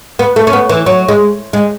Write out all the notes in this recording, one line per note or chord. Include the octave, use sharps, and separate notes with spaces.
B3
A3
C#4
B3
E3
F#3
G#3
G#3